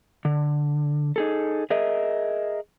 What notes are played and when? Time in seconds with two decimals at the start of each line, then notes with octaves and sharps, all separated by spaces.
0.25 D3
1.16 D#4 G#4 A4
1.70 G#4 A#4 D#5 E5